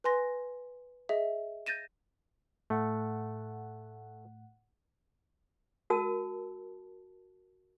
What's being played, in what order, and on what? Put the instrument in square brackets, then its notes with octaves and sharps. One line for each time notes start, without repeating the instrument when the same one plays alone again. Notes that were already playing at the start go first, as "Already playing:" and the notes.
[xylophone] B4 G#5 C6 A#6
G#4 D#5 E5
G6 A6 A#6 D#7 E7
[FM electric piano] A2 F#5 [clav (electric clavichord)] A3
[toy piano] F#4 A#4 A5 E6